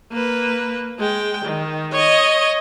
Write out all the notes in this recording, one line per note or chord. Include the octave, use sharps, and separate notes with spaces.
A#3 B4
G#3 G5
D#3
C#5 D#5